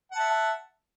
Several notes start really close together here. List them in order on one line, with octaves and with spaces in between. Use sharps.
F#5 A5 E5